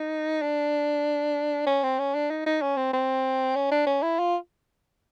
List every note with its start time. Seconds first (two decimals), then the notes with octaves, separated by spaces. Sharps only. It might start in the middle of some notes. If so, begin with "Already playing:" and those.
Already playing: D#4
0.42 D4
1.67 C#4
1.84 C4
1.99 C#4
2.15 D4
2.30 D#4
2.46 D#4
2.62 C#4
2.77 C4
2.93 C4
3.56 C#4
3.72 D4
3.87 C#4
4.03 E4
4.19 F4